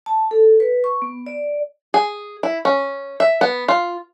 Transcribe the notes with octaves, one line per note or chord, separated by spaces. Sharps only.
A5
A4
B4
C#6
B3
D5
G#4
E4
C#4
E5
B3
F4